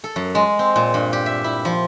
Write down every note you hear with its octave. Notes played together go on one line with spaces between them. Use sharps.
A4
F#2
G#3
C4
A#2
G2
G4
E5
E4
F3